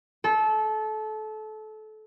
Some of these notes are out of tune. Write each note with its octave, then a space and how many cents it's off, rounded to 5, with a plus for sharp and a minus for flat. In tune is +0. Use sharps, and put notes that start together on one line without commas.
A4 -25